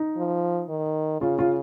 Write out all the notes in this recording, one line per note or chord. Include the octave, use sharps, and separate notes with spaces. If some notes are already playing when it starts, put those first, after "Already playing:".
Already playing: D#4
F3
D#3
C#3 F4
F4